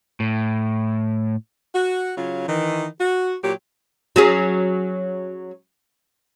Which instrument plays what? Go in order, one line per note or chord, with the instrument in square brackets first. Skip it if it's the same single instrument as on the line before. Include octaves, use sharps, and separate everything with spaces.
[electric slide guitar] A2
[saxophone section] F#4
C#3 F#3 F4
D#3 E3
F#4
A#2 F#3 G4
[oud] F#3 C#4 G#4